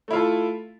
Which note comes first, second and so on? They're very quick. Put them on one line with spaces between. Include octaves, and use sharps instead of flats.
A3 E4 F4 A4